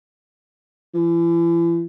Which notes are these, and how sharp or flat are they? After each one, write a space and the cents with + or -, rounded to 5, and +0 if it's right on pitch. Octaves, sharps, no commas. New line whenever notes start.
E3 +40